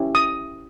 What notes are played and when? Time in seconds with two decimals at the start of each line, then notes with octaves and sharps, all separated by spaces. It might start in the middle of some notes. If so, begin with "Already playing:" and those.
Already playing: C#4 E4 G4
0.15 D#6